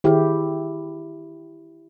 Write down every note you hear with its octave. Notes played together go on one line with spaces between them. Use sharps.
D#3 E4 G4 G#4